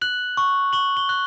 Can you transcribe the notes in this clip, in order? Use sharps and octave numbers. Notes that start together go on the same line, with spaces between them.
F#6 F#7
C#6
C#6 F#7
G7
F#6